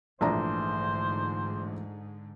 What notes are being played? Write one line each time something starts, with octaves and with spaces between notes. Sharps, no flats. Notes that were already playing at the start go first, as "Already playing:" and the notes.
A#1 G#2 D3 E3 A3 D4 C5 A#5